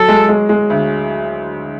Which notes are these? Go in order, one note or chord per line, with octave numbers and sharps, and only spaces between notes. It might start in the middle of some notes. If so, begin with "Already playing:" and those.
Already playing: F#3 A4
G#3
G#3
G#3
D2